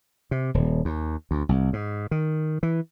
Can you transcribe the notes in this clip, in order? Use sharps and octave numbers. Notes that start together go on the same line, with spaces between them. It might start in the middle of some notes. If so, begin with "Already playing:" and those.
C3
D#1
D#2
D2
C2
G#2
D#3
E3